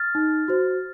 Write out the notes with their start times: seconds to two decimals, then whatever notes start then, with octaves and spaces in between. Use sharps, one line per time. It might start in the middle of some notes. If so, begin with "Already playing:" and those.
Already playing: F6 A6
0.15 D#4
0.48 F#4 C5